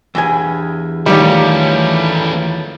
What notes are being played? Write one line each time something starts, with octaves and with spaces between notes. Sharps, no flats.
E2 G2 G#5
D#3 F3 G3 A3 C#4 C#5